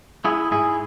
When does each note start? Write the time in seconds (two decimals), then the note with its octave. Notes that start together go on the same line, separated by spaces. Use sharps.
0.25 G#3 E4 G#4
0.51 G#2 E4 G#4